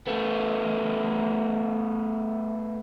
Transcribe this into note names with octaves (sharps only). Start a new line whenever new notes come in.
A3 B3